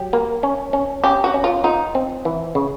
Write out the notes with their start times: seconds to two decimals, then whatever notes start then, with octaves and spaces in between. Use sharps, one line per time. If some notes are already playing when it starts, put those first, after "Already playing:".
Already playing: F#3 G4
0.13 A#3
0.43 C#4
0.73 C#4
1.03 C#4 G4
1.24 F#4
1.34 C#4
1.44 F4
1.64 D#4 F4
1.95 C4
2.25 E3
2.55 C#3